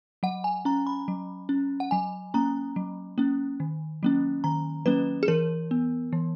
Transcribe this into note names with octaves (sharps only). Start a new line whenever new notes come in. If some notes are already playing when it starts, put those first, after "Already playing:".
F#3 F#5
G#5
C#4 A#5
B5
F#3
C#4
F#5
F#3 G#5
A#3 C#4 A#5
F#3
A#3 C#4
D#3
F#3 A#3 C#4
D#3 A#5
F#3 A#3 C#4 B4
G#4
E3 A#4
B3
E3